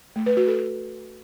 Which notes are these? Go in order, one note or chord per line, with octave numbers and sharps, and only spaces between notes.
A3
B4
F#4
A4